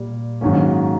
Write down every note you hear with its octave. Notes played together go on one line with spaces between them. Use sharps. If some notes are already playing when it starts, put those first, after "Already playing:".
Already playing: A#2 G3
G#2 D#3 F#3 A#3 C#4